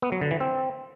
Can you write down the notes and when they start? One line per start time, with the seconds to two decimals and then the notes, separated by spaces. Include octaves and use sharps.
0.02 B3
0.12 F#3
0.21 D3
0.31 E3
0.40 C4